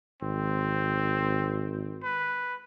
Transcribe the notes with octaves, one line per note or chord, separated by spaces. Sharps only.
G#1 C4
B4